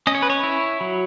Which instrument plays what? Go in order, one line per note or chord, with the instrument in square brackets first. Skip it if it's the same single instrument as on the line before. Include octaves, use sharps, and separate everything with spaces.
[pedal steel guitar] C#4 D#5
C#5
B4
C#5
E4
F#3